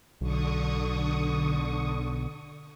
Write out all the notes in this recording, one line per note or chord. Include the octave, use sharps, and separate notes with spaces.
B1 D3 C#6 D#6